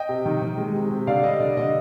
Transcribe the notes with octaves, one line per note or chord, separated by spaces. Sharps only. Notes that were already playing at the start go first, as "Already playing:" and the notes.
Already playing: D#5 G5
C3
D#3
D#3
G#3
C3
C3
D3 D5 F5
G3 D#5
D3 D5
D3 D#5